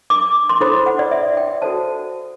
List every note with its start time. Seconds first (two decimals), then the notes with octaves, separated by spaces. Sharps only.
0.10 D6
0.49 C6
0.61 E4 A4 C5 B5
0.86 F#5
0.99 D5
1.11 E5
1.37 G5
1.62 F#4 A4 C5 A5